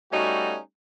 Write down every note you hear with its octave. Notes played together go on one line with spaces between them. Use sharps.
G3 A3 C#4 D#4 F#4